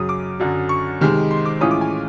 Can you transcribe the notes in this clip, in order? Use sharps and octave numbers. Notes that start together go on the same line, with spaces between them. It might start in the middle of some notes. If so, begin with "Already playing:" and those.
Already playing: F#2 C#3 F#3 D#6
D6
F#2 D3 F#3
C#6
C3 D#3 G#3
C6
D6
A2 E3 G#3 C#4 F4 D#6
D6
G#5